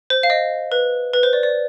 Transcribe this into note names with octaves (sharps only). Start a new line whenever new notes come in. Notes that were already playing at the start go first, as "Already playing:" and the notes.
C5
F5
D#5
B4
B4
C5
D5
D5